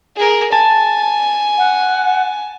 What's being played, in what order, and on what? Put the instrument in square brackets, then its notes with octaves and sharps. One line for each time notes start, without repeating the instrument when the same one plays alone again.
[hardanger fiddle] G#4 A#4
[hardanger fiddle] G#5 [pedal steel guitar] A5
[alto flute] F#5